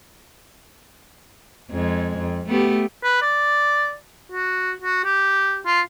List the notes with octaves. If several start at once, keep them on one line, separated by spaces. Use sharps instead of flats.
F2 G#3
F2
A3 B3 G4
B4
D5
F#4
F#4
G4
F4